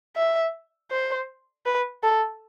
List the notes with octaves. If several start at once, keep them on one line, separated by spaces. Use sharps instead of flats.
E5
C5
B4
A4